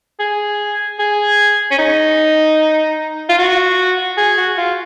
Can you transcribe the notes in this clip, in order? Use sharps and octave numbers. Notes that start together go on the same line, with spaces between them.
G#4
G#4
C#4
D#4
F4
F#4
G#4
F#4
F4